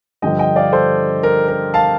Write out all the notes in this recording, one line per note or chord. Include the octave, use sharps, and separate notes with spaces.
G2 D3 F3 D#5 G5
D#5 G5
D5 F5
A4 C5
A#4
A#4
F5 A5